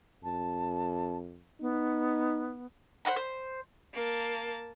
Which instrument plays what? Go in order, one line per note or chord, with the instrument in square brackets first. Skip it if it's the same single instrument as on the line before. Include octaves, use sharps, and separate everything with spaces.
[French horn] F2 [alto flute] A5
[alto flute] B3 [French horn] D#4
[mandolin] C5 D#5 F#5 B5
C5
[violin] A#3 A5